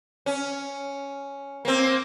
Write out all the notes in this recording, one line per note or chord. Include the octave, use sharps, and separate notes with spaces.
C#4
A#3 C4